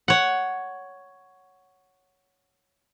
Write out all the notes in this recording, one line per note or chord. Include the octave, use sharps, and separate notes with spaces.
C#5 F#5